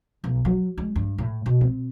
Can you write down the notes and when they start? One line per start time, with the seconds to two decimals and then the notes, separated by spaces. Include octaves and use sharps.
0.24 B1
0.45 F#3
0.78 G#3
0.96 G2
1.18 A2
1.46 B2
1.61 C4